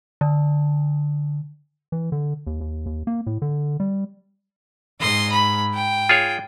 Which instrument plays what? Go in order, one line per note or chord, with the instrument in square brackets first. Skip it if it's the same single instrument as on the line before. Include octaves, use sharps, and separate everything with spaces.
[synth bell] D3
[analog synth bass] E3
D3
D#2
D#2
D#2
A#3
A2
D3
G3
[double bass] G#2 [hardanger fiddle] D#5 C6
[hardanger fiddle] B5
G5
[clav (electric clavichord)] F4 G#4 C#5